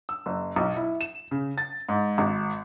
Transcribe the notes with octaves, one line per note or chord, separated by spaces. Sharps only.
E6
F#1
B1
E4
E7
C#3
A6
G#2
G#1